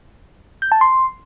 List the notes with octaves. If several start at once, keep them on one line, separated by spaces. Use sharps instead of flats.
G6
A5
C6